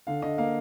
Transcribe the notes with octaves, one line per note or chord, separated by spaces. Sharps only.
D3 F5
D3 D#5
A#3 F5